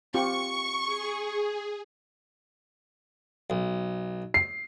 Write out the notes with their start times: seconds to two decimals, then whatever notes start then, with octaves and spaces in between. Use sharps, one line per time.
0.14 C4 F4 G4 C#6
0.84 G#4
3.50 B1
4.34 C7